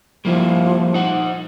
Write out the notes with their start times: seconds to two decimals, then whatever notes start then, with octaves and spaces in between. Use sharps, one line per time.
0.25 F3 G3 A#3 E4
0.94 D#4 F#5